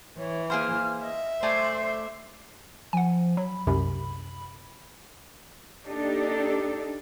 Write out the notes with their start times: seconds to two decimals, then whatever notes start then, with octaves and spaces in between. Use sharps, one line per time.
0.18 E3 C#5
0.50 A#3 G#4 C5 F6
1.02 D#5 E5
1.43 A3 C5 D5 G#5 C6
2.93 F3 F#5 G#5
3.37 F#3 B5
3.67 C2 F#2 C3 B5
5.86 A#3 D4 D#4 G4 A4